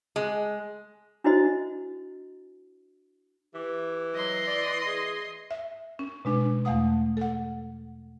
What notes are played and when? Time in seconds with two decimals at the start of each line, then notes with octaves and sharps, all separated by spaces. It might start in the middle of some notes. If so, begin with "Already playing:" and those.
0.16 G#3
1.24 D4 E4 F#4 C5 D#5
3.54 E3 G4
4.14 F#3 D#5 C6
4.47 D5
4.87 G#4
5.51 E5
5.99 C#4
6.25 B2 G#3 D4
6.65 E2 A3 F5 F#5 D#6
7.17 A4 F#5